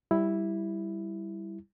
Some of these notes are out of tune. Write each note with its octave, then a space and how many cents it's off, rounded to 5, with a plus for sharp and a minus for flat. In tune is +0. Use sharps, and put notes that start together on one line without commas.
G3 +0 E4 +0